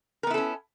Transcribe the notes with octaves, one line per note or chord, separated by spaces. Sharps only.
B3 C#4 E4 A4 A#4